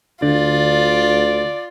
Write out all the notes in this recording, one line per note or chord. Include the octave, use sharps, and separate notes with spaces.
D2 D3 F4 D5